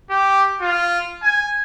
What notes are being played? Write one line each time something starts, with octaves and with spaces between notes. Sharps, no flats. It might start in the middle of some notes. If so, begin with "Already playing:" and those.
G4
F4
G#5